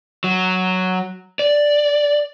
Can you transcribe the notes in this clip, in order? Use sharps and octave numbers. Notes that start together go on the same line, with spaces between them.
F#3
D5